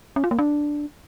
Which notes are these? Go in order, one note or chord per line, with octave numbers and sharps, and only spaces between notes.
C#4
F4
A#3
D4